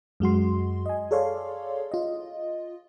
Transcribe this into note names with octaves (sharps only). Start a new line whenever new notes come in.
F#2 G#3 F#4 C6
D#5 G#5
G#4 A4 C#5 D5 F5 C6
F4 D#5